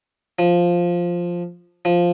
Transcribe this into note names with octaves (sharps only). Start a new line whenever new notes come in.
F3
F3